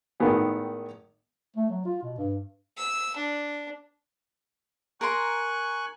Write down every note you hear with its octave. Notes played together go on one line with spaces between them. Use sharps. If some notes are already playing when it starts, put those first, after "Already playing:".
G#1 A2 D#3 G#3 B3 G#5
A3
F#3
F4
B2
G2
E6
D4
A#4 G#5 A#5 C6 C#6 F#6